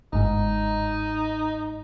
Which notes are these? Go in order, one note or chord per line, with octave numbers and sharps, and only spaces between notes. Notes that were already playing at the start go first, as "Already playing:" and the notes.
G1 G#2 D#4